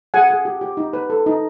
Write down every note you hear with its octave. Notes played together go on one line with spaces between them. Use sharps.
G#4 F#5 G#5
G#4
G4
G4
D#4
B4
A4
D#4